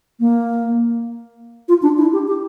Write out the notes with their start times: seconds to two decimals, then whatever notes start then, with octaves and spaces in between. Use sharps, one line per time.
0.20 A#3
1.68 F4
1.82 D4
1.98 E4
2.13 G4
2.28 G4